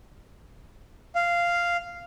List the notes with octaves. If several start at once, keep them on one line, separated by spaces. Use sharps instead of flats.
F5